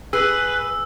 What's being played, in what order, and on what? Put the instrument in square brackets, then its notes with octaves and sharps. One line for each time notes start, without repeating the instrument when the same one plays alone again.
[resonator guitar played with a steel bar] G#4 [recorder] B4 [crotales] E6